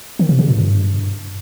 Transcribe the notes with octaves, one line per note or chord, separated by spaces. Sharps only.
D#3
C3
C#3
A2
G2